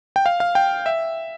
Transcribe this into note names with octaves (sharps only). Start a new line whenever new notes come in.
G5
F5
F5
G5
E5